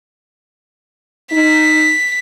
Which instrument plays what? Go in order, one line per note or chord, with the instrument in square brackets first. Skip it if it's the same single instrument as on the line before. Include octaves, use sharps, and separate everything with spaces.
[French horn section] D#4 [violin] B6